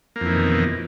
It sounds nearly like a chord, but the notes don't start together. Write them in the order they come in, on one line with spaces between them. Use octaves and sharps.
A#3 F2 E3 D#3 B2